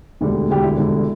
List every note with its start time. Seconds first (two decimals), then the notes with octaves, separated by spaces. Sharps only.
0.21 E1 D2 D3 G3
0.49 E1 D2 D3 G3 G4
0.64 E4
0.77 E1 D2 D3 G3